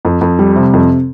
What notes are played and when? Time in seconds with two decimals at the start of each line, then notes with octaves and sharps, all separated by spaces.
0.05 F2
0.21 F2
0.39 G3
0.56 C3
0.73 F2